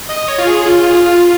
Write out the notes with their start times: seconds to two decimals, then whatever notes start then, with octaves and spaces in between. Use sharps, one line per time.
0.09 D#5
0.28 C#5
0.38 F4
0.47 G#4
0.66 F4
0.89 G#4
0.95 F4